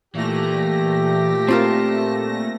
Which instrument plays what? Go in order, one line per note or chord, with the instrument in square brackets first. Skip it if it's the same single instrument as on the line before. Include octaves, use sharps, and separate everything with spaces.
[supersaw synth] A#2 A3 A#6 [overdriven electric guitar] E3 [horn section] G4
[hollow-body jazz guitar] C4 F4 A#4 [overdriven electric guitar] A5